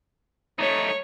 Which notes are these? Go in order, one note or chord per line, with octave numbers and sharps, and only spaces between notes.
A3 D#4 C#5